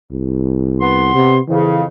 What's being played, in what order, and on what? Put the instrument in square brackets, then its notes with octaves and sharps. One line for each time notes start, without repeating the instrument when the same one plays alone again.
[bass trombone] C2
[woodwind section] B3 C6
[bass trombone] C3
[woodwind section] F2 C#3 [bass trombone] E3